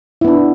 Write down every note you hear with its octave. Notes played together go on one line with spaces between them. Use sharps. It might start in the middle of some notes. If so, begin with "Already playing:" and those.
B3 D4 E4